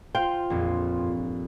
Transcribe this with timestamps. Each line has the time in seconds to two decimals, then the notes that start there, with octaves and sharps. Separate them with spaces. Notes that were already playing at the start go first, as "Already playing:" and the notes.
0.15 F4 C5 G5
0.50 A#1 F2 A#2
0.98 G2